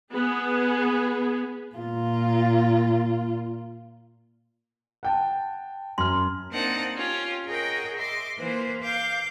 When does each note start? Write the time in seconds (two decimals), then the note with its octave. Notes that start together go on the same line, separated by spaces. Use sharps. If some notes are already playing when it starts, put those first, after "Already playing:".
0.13 B3 G#4
1.76 A#2 F4
5.03 F#5 G5 A5
5.98 F#2 C6 F6
6.52 A#3 C4 D4 D#4 F#5 A5
6.95 C#4 F4 G4
7.46 G#4 A#4 C#5 D#5 F#5 G5
7.97 D#5 E5 C6 D6
8.38 E3 A#3 B4 C5
8.83 F5 D6 G6